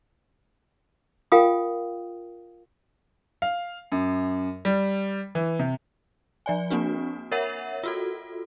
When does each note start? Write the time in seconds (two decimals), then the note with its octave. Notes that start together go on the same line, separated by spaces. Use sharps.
1.32 F4 A#4 F5 G5 G#5 D#6
3.42 F5
3.92 F#2
4.65 G3
5.35 E3
5.59 C3
6.46 F3 D5 G#5
6.70 A#3 C4 D4 F#4
7.31 A#4 C#5 E5 F#5
7.83 F4 F#4 A4